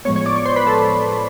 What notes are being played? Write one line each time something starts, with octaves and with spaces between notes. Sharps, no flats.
A2 F3 G#3 B3 C#5 C#6
C#5 C#6
D5 D6
C#5 C#6
C5 C6
B4 B5
A4 A5